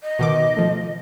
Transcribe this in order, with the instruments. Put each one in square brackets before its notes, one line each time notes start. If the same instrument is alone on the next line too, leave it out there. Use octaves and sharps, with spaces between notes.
[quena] D#5
[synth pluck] B2 D#3 D6
F3 A3